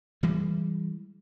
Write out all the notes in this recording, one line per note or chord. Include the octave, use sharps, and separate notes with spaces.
E3 G3 G#3